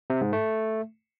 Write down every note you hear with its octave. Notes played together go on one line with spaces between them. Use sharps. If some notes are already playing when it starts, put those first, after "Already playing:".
C3
G#2
A3